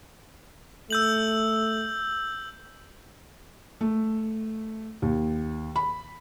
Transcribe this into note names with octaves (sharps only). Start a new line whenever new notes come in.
A3 E6 G6 F#7
A3
D#2
B5